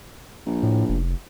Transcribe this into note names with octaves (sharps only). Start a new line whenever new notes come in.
A#1
A2
F1